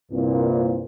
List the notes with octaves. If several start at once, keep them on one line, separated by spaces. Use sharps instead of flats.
C2 G2 A#2